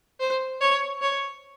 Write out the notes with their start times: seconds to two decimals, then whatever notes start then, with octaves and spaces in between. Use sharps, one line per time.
0.20 C5
0.61 C#5
1.01 C#5